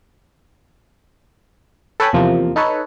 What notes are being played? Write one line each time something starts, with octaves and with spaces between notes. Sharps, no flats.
A4 B4 C#5 G5 G#5 B5
E2 C3 F3 A#3
D#4 A4 B4 C#5